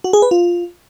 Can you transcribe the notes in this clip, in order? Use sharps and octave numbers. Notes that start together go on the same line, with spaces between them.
F#4
G#4
B4
F4